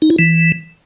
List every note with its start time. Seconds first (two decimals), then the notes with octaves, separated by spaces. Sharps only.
0.02 D#4
0.10 E4
0.19 E3